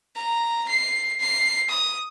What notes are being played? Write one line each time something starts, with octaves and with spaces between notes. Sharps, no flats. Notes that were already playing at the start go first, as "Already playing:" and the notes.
A#5
C7
C7
D#6